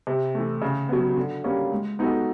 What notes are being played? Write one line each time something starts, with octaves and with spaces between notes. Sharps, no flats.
C3
E3 A3
C#3
F#3 B3
D3
G3 A#3 C#4
G#3
B3 D#4 F#4 A4